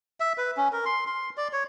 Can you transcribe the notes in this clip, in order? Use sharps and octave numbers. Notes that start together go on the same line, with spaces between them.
E5
B4
C#4
A#4
C6
C6
D5
C#5